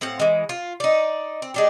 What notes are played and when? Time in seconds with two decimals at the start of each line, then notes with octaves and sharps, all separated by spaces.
0.01 A2 C4 F5 F#5
0.20 E3 G#3
0.49 F4
0.80 D#4 D5
1.42 C4
1.54 G#3 D4 G4